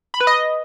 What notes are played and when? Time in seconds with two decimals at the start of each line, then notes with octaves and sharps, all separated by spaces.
0.14 B5
0.21 B4
0.27 D#5